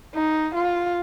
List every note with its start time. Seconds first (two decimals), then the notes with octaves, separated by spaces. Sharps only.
0.15 D#4
0.55 F4